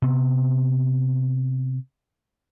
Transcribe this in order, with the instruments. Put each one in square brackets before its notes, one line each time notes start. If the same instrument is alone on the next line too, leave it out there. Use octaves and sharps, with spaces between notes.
[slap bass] C3 B3